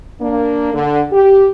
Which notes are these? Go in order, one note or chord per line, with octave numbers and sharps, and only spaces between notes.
A#3 D4
D3
G4